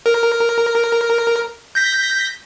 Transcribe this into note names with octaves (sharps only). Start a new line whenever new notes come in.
A#4
G6 A#6 B6